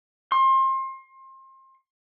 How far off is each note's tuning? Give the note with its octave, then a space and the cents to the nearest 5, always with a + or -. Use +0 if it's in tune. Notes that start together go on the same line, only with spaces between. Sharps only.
C6 +30